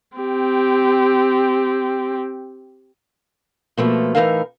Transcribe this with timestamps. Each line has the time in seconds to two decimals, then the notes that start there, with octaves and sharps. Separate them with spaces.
0.17 C4 G4
3.77 B2 F3 A3 A#3
4.15 A2 E3 A3 D#4 A#4 F5